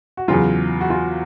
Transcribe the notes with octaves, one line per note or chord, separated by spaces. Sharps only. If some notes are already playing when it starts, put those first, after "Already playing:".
F#4
E2 C#3 F#3 F4
F#4
F4